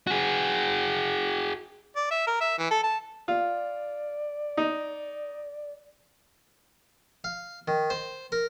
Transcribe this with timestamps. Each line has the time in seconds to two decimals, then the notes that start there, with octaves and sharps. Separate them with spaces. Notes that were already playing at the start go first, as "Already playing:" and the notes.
0.07 F#4 G#4
1.96 D5
2.11 E5
2.27 A#4
2.41 E5
2.58 E3
2.71 A4
2.84 A5
3.28 F4 D5
4.57 D#4
7.24 F5
7.68 D#3
7.90 C5
8.32 A#4